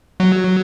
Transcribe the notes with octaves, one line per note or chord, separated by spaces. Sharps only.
F#3